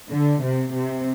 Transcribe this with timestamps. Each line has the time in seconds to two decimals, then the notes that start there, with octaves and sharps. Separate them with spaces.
0.11 D3
0.42 C3
0.73 C3